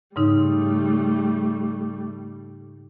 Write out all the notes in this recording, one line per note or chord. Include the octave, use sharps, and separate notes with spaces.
G#2 C#3 G3 A3 D#4